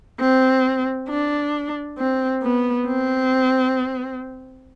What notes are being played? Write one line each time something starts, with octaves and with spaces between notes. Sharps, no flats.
C4
D4
C4
B3
C4